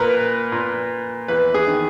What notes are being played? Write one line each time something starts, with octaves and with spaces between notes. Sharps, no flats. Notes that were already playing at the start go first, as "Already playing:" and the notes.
Already playing: A#2 A#4 B4
A#2
E2 B4
G#4
D#3